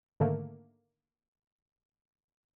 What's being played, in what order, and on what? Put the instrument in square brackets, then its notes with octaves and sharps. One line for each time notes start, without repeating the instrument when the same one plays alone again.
[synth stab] G#2 D3 D#3 A3 A#3